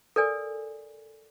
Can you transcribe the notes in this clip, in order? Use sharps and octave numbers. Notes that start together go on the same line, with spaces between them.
A4 A#4 D5 G#5